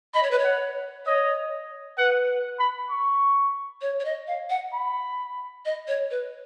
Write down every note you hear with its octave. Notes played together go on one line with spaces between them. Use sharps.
D#5 B5
C#5
B4
C#5
F#5
C#5 D#5
B4 F#5
B5
C#6
C#5
C#5
D#5
F5
F#5
B5
D#5
C#5
B4